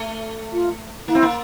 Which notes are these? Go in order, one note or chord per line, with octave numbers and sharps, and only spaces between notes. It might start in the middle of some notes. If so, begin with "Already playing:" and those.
Already playing: A3
F4
A#3 E4
C4
A#3